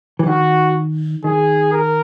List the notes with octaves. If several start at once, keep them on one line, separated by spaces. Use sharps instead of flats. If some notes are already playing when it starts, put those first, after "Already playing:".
E3
D#3 F#4
D#3 G#4
A#4